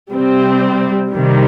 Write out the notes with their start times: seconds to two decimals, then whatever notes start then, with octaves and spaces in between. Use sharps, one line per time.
0.12 C3 G3 C4
1.12 C3 D#3 G3